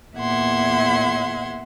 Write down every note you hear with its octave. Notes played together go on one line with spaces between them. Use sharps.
E2 A#2 E5 F#5 C6 G#6